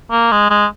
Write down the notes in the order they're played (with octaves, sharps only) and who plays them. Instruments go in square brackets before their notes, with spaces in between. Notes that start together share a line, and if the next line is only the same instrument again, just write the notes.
[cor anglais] A#3
G#3
G#3